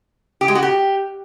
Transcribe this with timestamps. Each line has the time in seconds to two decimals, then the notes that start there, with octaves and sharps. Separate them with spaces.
0.41 G4
0.48 G#3
0.55 F#4
0.63 G4